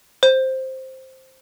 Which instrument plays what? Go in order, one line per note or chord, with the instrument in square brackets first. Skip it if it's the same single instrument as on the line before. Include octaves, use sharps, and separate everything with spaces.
[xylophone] C5